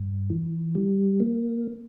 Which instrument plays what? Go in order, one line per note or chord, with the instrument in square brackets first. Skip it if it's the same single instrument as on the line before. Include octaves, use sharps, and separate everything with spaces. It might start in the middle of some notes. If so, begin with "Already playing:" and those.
Already playing: [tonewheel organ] G2
E3
G3
A#3